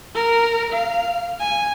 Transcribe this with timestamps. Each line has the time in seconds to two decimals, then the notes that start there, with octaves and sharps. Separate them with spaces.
0.15 A#4
0.73 F5
1.40 G#5